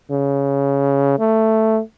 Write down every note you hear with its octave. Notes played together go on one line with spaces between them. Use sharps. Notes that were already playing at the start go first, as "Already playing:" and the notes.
C#3
A3